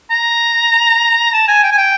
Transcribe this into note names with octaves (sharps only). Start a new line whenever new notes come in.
A#5
A5
G#5
G5
G#5
G5